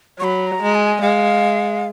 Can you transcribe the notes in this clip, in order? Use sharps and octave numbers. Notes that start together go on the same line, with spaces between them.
F#3 B5 C#6
A#5
G#3
G#5
G#3 F5